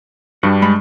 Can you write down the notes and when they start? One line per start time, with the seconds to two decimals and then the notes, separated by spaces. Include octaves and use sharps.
0.43 G2 G3 D4 F#4
0.62 G#3 B5